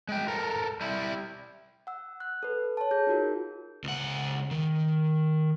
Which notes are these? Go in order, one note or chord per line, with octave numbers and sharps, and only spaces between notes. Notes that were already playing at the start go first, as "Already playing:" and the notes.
G#3 G5
A4 A#4
G3 E4
F#5 E6
F#6
A4 B4
C#5 A5
G#4 G6
D#4 F4 F#4 A#4
C#2 F#5
D#3